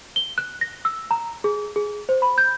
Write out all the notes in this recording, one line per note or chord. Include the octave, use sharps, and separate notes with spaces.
G7
F#6
A#6
E6
A#5
G#4
G#4
C5
B5
G6